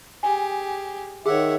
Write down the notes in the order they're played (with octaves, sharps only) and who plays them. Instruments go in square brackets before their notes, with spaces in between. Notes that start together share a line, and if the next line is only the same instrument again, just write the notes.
[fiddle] G4 G#4 [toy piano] G#5
[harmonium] D#3 E5 [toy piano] G#4 [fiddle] C#5 F#5